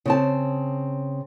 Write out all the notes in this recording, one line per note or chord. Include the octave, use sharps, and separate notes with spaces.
C#3 C4 A5